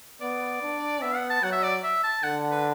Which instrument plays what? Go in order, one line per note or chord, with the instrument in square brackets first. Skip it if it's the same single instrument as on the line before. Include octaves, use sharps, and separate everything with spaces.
[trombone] B3 [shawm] D5
[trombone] D4
[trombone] B3 [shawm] E5
[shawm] F#5
A5
[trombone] F#3 [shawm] F#5
[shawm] E5
D5
E5
A5
[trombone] D3 [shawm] F#5
[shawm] B4